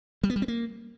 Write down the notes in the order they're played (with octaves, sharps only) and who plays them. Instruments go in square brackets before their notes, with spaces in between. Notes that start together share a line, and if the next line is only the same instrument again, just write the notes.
[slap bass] G3
B3
G3
C4
A#3